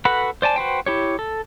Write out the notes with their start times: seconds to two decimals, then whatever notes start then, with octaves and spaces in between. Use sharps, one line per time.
0.05 F#4 A4 B4 F#5 B5
0.42 C5 D5 G#5 A5
0.56 F#4 B4 C5 G5
0.86 E4 G4 C#5
1.19 A4